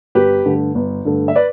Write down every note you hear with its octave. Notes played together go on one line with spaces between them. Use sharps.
G1 G4 B4
G2 D3 A3
G1
G2 D3 A3
E5
B4 D5